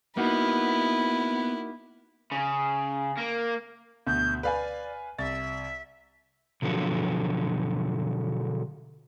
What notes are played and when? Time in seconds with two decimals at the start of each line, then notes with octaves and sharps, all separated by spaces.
0.17 A#3 B3 D#4 E4 F#4
2.31 C#3
3.17 A#3
4.07 D2 B2 G6
4.43 B4 D5 F5 G#5
5.18 C2 E5 A6
6.62 B2 D3 F3 F#3